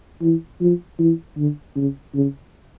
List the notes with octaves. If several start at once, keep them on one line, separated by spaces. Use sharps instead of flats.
E3
F3
E3
D3
C#3
C#3